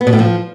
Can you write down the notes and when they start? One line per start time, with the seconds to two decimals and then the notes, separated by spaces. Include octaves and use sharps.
0.01 B3
0.07 B2
0.13 A2
0.19 F3